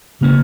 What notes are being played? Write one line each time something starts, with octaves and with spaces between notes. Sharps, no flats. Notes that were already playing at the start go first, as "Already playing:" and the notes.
C#3 A#3 C#4